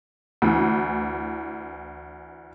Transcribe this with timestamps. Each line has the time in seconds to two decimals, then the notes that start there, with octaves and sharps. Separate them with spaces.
0.42 D2 E3